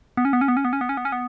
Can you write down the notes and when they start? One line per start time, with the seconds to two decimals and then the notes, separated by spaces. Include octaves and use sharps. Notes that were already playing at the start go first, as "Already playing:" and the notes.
0.17 B3
0.25 C#4
0.33 B3
0.41 C#4
0.48 B3
0.57 C#4
0.65 B3
0.73 C#4
0.81 B3
0.89 C#4
0.97 B3
1.05 C#4
1.12 B3